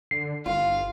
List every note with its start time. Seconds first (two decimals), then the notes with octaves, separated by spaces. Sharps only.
0.11 D3 C7
0.46 G1 F4 F5